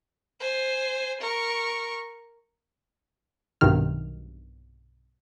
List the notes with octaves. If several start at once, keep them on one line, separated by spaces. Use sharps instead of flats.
C5 G#5
A#4 C#6
B1 G2 C3 D#3 F6